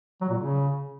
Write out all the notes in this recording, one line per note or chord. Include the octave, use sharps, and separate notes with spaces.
F#3
A#2
C#3